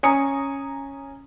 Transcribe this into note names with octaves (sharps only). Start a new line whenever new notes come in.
C#4 G#5 A#5 D#6 C#7